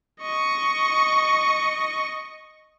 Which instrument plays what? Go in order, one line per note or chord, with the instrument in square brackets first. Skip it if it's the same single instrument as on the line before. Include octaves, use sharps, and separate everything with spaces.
[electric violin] D#5 C#6